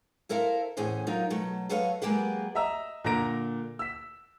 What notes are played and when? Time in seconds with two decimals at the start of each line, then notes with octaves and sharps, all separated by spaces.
0.29 E4 A4 A#4 C5 E5 F5
0.77 E2 A2 C#4 G#4 C5
1.07 F#3 D#4 F4 A#4
1.30 B2 F#3 A3
1.69 F#3 A4 B4 C#5 D#5 F5
2.02 F#3 G#3 A#3 B3 G4 B4
2.55 D#5 E5 A#5 E6
3.04 A#2 D3 A#5 A#6 D7
3.79 E6 B6